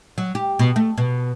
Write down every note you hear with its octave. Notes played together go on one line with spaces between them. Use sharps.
F#3
G4
B2
A3
B2